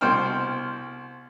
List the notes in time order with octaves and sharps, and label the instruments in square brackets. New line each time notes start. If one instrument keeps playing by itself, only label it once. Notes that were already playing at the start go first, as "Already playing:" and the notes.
[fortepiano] C2 B2 C5 G5 F6